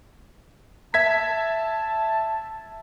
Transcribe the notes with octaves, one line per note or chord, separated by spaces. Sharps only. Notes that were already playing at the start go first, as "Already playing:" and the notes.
E5 A5 G#6 B6